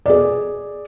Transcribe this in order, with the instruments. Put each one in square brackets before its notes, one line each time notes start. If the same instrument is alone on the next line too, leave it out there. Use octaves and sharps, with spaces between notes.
[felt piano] G#4 D5